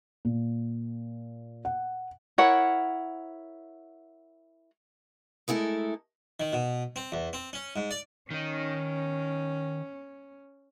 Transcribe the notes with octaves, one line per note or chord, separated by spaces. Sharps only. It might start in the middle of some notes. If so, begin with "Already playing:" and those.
A#2
F#5
E4 A#4 C#5 F#5
G#3 A3 E4 A4 A#4
D#3
B2
C4
E2
C4
C#4
G#2
D5
D#3 C#4 D#4